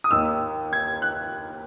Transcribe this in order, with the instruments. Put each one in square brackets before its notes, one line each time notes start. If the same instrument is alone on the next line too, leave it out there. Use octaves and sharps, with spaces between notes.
[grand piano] D#6
D#2 D#3 A#3 E6
G#6
F#6